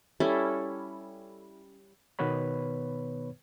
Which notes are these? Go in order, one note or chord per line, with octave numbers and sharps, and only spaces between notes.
G3 C#4 E4 A4
B2 D#3 B3 B4 C#5 B5